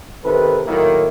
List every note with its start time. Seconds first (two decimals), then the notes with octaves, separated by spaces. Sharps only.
0.24 C3 D#3 A4 B4
0.67 A2 D#3 F#3 A#3 E4